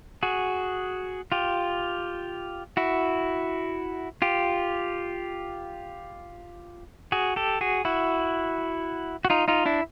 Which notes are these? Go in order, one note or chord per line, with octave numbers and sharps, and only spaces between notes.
F#4 G#4
F4 G4
E4 F#4
F4 G4
F#4 G#4
G4 A4
F#4 G#4
E4 F#4
F#4
D#4 F4
D#4 F4
D4 E4